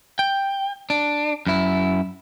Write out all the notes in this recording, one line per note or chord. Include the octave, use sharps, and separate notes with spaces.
G5
D4
F#2 E4